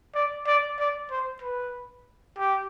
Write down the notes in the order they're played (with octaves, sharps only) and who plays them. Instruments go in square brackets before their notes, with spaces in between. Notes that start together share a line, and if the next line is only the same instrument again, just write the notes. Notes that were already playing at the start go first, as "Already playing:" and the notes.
[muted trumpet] D5
D5
D5
C5
B4
G4